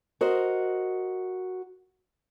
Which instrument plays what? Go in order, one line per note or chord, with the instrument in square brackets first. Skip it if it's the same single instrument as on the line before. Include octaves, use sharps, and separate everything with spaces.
[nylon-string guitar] F#4 A#4 C5 D#5